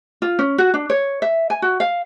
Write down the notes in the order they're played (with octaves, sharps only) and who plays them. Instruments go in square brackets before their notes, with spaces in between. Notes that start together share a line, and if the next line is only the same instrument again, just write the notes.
[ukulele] F4
C#4
F#4
D4
C#5
E5
G#5
F#4
F5